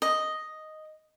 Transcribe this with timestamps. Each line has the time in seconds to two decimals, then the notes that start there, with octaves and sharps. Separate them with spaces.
0.02 D#5